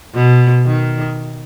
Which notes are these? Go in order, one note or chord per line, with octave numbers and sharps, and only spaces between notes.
B2
D#3